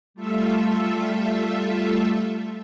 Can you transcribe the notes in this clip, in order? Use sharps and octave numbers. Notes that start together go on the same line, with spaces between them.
G3 A3 F4 A4 E5